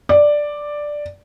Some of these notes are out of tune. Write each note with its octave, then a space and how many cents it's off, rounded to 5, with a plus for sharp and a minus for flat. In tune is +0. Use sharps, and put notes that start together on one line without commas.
D5 +5